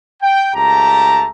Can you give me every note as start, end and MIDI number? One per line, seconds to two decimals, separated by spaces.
0.22 0.50 79
0.55 1.29 37
0.55 1.29 57
0.55 1.29 67
0.55 1.29 81
0.55 1.29 82